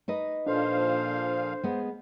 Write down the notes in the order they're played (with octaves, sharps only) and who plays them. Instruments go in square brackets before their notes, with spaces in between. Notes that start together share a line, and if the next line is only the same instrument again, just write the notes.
[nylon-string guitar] D#4 B4 D#5
[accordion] A#2 F3 F5 [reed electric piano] D4 A4 [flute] C5
[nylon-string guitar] G#3 B3